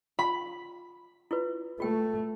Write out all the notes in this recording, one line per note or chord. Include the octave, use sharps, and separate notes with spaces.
F4 B5
E4 F4 B4
A3 F4 G5